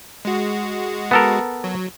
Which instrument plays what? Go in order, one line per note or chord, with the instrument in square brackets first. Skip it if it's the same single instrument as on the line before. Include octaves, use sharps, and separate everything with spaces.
[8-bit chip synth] G#3 F#4
[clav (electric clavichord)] B3 A4 A#4
[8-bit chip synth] F#3